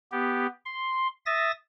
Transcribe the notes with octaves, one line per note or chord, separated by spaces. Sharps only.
B3 G4
C6
E5 D#6 A6 A#6